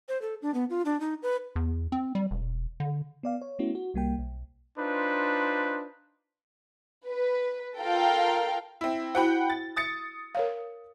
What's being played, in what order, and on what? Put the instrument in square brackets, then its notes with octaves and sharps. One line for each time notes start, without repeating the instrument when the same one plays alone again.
[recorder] C5
A4
D4
B3
F4
D4
D#4
B4
[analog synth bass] E2
C4
G3
E1
D3
[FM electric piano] B3 D5 F5
C#5
A3 B3 C#4 E4 F#4
F#4
C2 G3 A#3 G5
B1
[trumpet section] D4 D#4 F4 B4 C5
[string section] B4
F4 A4 A#4 F5 G5
[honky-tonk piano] C4 E4
[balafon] E4 F#4 C5 [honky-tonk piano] F#5 G5 B5
[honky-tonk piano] A6
D#6 A6 C#7
[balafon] A#4 C#5 F5